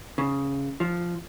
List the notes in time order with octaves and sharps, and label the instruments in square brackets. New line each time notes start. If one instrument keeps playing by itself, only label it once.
[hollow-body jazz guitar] C#3
F3